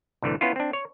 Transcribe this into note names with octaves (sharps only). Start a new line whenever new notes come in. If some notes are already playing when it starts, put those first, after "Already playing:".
C2 A2 D3 E3 A3
B3 C#4 E4 F4
C4 D4
C#5